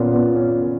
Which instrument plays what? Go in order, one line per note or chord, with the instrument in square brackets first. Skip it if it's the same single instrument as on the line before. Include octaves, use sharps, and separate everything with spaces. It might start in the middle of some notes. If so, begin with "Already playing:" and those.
Already playing: [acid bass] A#2 [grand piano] B3 C#4 F4
[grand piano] B3
C#4